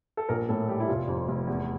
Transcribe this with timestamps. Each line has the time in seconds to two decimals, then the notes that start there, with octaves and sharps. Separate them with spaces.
0.17 A4
0.29 A#1 A#4
0.49 A2 A4
0.68 G3 G4
0.80 E4
0.88 F1 F4
1.07 F2
1.28 F1
1.47 E2